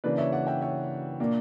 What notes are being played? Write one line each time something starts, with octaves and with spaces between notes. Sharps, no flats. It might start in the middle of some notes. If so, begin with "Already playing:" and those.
C#3 E3 A#3 D4 B4 D5
C#5 E5
D5 F#5
E5 G5
C#5 E5
A#2 A#3 D4